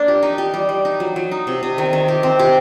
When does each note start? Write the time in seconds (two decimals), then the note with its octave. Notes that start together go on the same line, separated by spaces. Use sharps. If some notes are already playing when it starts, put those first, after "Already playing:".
Already playing: A#3 D4
0.08 G4
0.23 D#4
0.38 G4
0.54 G3
0.69 G3
0.85 D#4
1.00 F#3
1.16 F#3
1.31 D#4
1.47 C3
1.63 C3
1.78 D#3
1.93 D#3
2.08 G4
2.23 C4
2.39 G4